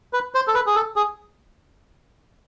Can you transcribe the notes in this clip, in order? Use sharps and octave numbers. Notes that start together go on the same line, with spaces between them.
B4
C5
A4
B4
G#4
A4
G#4